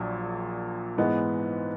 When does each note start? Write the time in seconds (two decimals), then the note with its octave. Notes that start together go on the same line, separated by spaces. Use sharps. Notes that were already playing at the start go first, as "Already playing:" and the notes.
Already playing: A#1 A#2 F#3
0.98 G#2 E3 G#3 B3